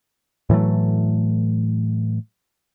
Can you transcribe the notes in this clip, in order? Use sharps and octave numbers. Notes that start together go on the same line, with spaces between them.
A2 E3 F#3 A3